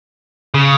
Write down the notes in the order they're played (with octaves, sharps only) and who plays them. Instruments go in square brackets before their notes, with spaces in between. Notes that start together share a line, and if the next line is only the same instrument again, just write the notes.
[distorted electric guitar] C#3